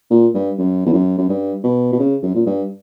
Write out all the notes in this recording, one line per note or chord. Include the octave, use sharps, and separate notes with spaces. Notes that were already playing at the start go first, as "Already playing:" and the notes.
A#2
G2
F#2
E2
F#2
F#2
G2
B2
B2
C#3
F#2
A#2
G2